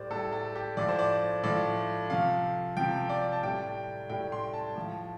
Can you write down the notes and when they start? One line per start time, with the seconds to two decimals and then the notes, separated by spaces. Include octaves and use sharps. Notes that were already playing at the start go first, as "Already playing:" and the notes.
Already playing: A2 G3 C5 D5
0.10 A2 G3 A4
0.32 A4
0.56 G4
0.77 A2 F3 D5
0.89 C5
0.99 D5
1.43 A2 F3 D5
2.10 C3 F3 F5
2.77 C3 F3 G5
3.09 D5
3.32 A5
3.43 A2 G3 G5
4.10 A2 G3 G5
4.32 C6
4.54 A5
4.76 A2 F3